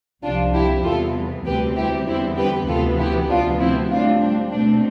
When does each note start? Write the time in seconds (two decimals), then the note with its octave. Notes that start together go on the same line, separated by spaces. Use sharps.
0.23 C2 C3 F3 D4 F4
0.53 E4 G4
0.84 E2 C3 E3 G3 B3 F4 A4
1.46 D2 C3 G3 C4 G4 B4
1.76 E4 G4
2.07 E2 D3 G3 B3 C4 E4
2.37 G4 B4
2.68 D2 C3 E3 B3 F4 A4
2.99 E4 G4
3.29 D2 C3 F3 B3 D4 F4
3.60 C4 E4
3.91 A2 G3 C4 D4 F4
4.21 D4
4.51 B2 A3 C4 D4